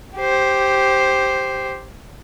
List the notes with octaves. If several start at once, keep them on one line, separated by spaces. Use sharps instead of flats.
G4 C5